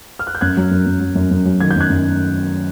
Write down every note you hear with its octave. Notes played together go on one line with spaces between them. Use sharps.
F6
F#6
G6
F#2 F#6 G#6
F#3
F#2
F#2
F#3
F#2
F#2
F#3
D#3 G#6
G6
F#2 F#6 G#6
F#2